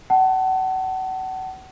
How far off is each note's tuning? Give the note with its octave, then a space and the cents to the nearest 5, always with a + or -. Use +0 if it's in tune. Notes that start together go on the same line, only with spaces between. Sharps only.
F#5 +35 A5 +0